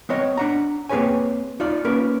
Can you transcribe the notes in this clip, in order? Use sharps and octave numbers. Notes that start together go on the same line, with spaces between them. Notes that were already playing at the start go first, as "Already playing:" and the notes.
B3 C4 C#5 D#5
D4 F#5 A#5
A#3 C4 G#4 B4 C#5 G#5
D#4 F4 D5
A#3 C#4 A#4 B4